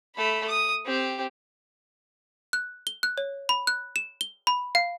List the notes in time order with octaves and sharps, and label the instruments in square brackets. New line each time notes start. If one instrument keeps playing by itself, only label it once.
[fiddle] A3 B5
D#6
C4 G4
[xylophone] F#6
G7
F#6
C#5
B5
F#6
E7
G7
B5
F5